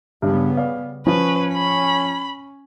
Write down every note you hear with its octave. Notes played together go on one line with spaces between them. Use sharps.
G2 C#3 G3 B3
D5 F5
F3 C#4 B4
B5